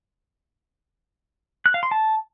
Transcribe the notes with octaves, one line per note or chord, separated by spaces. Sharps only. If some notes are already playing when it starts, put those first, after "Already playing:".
F#6
F5
C6
A5